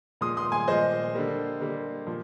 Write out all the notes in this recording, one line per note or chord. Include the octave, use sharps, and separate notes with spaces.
A#2 F3 G#3 C6 D#6
C6 D#6
G#5 C6
A#2 F3 G#3 C5 D#5
D3 G3 A#3
D3 G3 A#3
A#2 F3